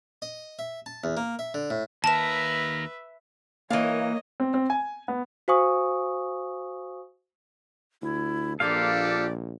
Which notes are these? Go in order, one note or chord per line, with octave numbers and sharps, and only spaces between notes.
D#5
E5
A5
E2
A#3
E5
D3
A2
D#2 A#4 B4 E5 A5 E7
E3 A#3 C#5 D#5 F5
C4
C4
G#5
B3
F#4 C5 F5 G#5 C#6 D#6
D2 E4
A#1 A#3 D4 F4 G4 A4 D5 F5